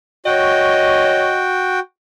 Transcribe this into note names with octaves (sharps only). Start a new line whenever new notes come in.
F#4 C#5 D#5 G5